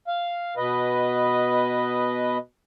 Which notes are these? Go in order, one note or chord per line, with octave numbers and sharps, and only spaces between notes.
F5
B2 B4 D#5